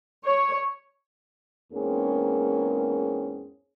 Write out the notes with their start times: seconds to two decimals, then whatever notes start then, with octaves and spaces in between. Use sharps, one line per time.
0.23 C#5
1.73 E2 G#2 A#3 C4 C#4 G#4